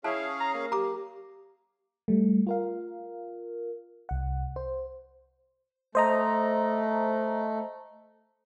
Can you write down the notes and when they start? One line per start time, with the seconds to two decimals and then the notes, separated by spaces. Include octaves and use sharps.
0.04 C#4 E4 G#4 F5 A5
0.40 A#5
0.54 A#3
0.72 G4 A#5 D6
2.08 G3 A3
2.47 F4 A#4 F5
4.09 C2 F#5
4.56 C5
5.95 A3 C5 D#5 A#5